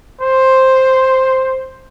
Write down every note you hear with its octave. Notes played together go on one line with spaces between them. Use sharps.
C5